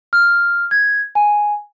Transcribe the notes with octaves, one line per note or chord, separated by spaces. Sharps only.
F6
G#6
G#5